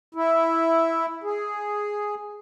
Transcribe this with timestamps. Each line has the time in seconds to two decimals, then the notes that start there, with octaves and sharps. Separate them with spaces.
0.15 E4
1.24 G#4